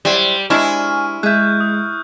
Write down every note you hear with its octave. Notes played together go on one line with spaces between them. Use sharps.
F#3 G3 E4 C5
G#3 D4 E4 C5 G#5 C#6 F6
G#3 G#4 E5 F#6 G6
D#6